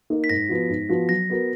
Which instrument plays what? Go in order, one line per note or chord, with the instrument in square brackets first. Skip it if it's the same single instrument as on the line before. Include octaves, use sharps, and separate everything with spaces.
[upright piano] A#3 D#4
[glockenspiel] B6
[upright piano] G#2 [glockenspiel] A#6
[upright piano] F3 B3 F#4
G#2
F3 B3 F#4
[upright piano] F#3 [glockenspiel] A#6
[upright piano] B3 F#4 A#4